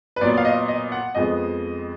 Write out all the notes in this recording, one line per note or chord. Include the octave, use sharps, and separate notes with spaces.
B4
A#2 F#3 B3 D5
F5
D#5
D#5
F#5
F2 F3 G#3 B3 D#5